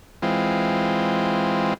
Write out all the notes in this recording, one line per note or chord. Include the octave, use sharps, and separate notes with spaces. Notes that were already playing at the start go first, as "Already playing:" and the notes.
E3 G#3 C4 F4